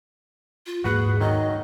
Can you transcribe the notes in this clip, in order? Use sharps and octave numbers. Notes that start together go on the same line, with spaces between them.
F4
D#1 G#2 A#3 F#4 G#4 B4 F#5
D#3 F#3 D#5